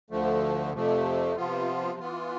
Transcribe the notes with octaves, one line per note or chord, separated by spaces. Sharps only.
D2 D3 F3 A3
F2 C3 F3 A3
C3 F3 B3 F4
E3 B3 F4